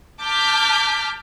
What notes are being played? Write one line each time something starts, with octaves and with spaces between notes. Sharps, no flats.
A5 D6 F6 G6 B6